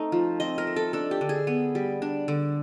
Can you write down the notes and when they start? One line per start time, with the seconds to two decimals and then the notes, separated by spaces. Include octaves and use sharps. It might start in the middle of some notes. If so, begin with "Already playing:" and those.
Already playing: A3 C4 D#4
0.12 F3
0.40 C4 D#5
0.58 A#4
0.67 A3
0.76 A4
0.93 D4 A4
1.11 G4
1.21 D3
1.29 G#4
1.47 B3
1.75 G3
2.02 D4
2.28 D3